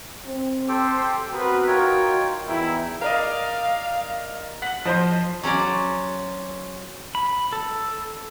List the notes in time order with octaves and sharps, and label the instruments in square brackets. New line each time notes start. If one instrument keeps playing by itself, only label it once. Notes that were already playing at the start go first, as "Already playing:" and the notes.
[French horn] C4
[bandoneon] G4 A4 G5 [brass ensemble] C5
[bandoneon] B3 [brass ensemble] C4 A#4 B4 [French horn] F#4
[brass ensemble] D#4 A#4 [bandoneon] F4 C#5 G5
[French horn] E2 [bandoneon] D#4 G5 [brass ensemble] E4
[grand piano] A#4 D5 D#5 [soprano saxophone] F5
[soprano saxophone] F#5 [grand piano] B6 F#7
[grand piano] F3 C5 C6 [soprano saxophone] D#5
[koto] F#3 C#4 C5 D5
[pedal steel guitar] B5
A4